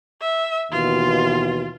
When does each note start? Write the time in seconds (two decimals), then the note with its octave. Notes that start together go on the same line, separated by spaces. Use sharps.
0.21 E5
0.72 D#2 B2 E3 F4